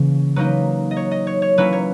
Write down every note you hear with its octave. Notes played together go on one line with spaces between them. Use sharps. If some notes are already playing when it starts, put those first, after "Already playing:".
Already playing: C#3 E3 A#3 C#4
F#3 A#3 D#4 B4
D#5
C#5
D#5
C#5
C#5
F#3 A#3 C#4 E4 B4
C#5